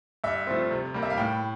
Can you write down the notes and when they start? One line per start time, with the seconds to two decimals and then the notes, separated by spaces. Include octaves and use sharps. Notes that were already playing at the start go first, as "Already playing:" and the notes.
0.24 G2 E5
0.47 F3 A3 C4
0.71 C3
0.94 G3 A#3
1.03 E5
1.10 F5
1.17 A2 G5